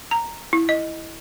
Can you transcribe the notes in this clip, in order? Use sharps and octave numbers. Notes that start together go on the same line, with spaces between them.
A#5
E4
D#5